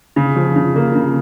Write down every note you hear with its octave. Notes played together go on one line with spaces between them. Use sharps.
C#3
F3
C#3
A#3
C#3